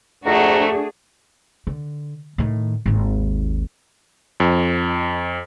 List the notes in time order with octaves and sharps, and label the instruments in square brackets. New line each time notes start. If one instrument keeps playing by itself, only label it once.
[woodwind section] F2 F#5 A#5 [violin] A3 F#4 [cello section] D4 G#4
[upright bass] D3
A2 D#3
G#1 D#2
[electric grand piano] F2